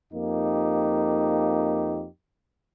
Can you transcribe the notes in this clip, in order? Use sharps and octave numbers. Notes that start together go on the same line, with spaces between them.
F2 A#3 D#4 G4